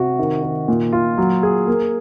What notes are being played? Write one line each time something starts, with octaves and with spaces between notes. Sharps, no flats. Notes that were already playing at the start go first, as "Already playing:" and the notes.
Already playing: C3 F#4
D#3
D#3
A#2
F4
F#3
G#4
A#3